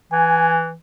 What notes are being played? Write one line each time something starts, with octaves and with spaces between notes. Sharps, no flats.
E3 G#5